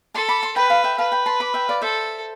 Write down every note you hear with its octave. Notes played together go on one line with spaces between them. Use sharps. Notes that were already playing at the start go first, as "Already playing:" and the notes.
A4 A5 C6
B5 D6
A5 C6
B4 G5 B5
F5 A5
E5 G5
B4 F5 A5
G5 B5
A5 C6
B5 D6
E5 G5
D5 F5
A4 C5 E5